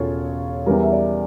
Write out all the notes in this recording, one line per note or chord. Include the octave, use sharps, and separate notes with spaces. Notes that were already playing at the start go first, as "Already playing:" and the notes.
Already playing: E1 C#3 F4 A4 C#5
E2 E3 G3 A#4
E5
D5